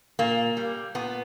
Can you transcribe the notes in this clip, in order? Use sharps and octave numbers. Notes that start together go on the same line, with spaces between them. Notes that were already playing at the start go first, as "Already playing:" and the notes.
A#2 A#3
G3
A#2 B3